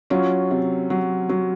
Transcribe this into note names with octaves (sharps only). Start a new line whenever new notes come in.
F#3 C#4 F4
C3
F#3
F#3